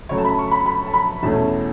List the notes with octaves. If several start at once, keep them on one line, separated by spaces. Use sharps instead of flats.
C#3 F#3 A3 C#5
A5
B5
C#6
B5
B5
A5
B5
E2 B2 A3 C#4 A5